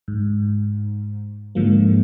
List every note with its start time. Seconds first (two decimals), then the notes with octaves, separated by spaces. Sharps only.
0.08 G#2
1.55 G#2 D3 F3 G#3 A#3